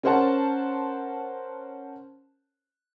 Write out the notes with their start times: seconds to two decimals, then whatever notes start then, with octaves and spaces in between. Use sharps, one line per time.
0.03 C#4 A#4 C5 C#5 F#5 A5